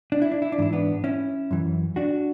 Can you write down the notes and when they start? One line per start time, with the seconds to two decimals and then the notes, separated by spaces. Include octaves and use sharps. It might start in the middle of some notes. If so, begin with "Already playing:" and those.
0.12 D4
0.22 E4
0.32 D4
0.42 E4
0.52 D4
0.58 G#2 E3 E4
0.73 B3 D4
1.04 C#4 E4
1.51 F#2 E3
1.96 D4 F#4